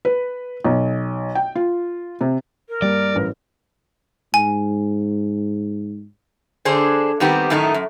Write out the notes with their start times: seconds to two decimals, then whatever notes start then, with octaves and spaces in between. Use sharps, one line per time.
0.05 B4
0.65 B1
1.35 G5
1.55 F4
2.21 C3
2.68 A#4
2.82 G2 G3 A#3 D5
3.14 A1 B4
4.34 G#2 G#5
6.65 D3 D4 G#4 C5
7.20 D#3 G3 B3 C4 G4
7.50 F#2 A2 D#3 A3 D#4
7.74 F#2